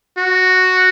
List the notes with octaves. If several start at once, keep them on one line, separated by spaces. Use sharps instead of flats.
F#4